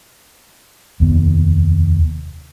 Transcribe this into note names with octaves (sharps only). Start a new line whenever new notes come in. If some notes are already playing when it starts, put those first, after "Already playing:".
F1 D#2 B3